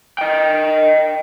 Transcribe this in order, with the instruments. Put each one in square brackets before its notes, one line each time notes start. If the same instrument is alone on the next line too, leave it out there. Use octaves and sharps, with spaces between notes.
[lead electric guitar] D#5 G5